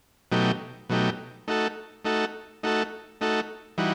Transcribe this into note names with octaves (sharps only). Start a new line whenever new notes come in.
B2 F#3 A3 D#4 G4
B2 F#3 A3 D#4 G4
A3 D#4 F#4 A4
A3 D#4 F#4 A4
A3 D#4 F#4 A4
A3 D#4 F#4 A4
E3 G3 D#4 F#4